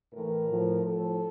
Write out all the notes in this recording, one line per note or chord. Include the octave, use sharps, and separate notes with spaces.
A2 E3 A#4
A2 F3
A2 F3 A4